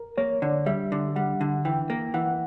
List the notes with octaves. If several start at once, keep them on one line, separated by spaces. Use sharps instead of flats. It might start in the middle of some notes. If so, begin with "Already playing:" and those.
Already playing: A#4
A#3 C#5
D3 D5
G3 E5
D3
G3 F#5
D3
E3 G5
A#3
E3 F#5